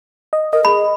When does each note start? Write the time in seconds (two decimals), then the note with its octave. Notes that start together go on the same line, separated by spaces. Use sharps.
0.33 D#5
0.53 A#4 D#5
0.65 G#4 B5